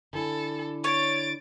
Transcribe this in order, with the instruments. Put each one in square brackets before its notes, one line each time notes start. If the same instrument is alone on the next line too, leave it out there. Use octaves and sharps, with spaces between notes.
[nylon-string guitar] D3 E4 G#5 [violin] A4
[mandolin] C#5 [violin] A6 D7